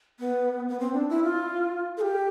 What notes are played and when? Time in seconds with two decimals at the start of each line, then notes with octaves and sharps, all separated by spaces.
0.19 B3
0.69 B3
0.79 C4
0.94 D4
1.09 E4
1.23 F4
1.97 A4
2.01 G4